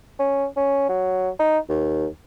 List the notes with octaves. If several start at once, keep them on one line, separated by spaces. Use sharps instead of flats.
C#4
C#4
F#3
D#4
D#2